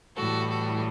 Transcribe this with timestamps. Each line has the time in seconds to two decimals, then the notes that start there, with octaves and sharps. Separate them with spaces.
0.16 A2 E3 G3 F#4 A4
0.50 F#4 A4